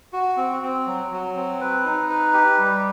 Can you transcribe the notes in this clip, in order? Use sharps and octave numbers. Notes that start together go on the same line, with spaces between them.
F#4
C4
C4
F#3
F#3
C4
B4
D#4
B4
G4
G3